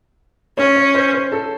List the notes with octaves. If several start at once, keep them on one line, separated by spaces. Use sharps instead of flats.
C#4 C#5
C#5
C5
C5
A4